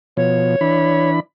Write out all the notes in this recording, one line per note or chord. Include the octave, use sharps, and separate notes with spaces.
B2 F3 C#5
E3 D4 B5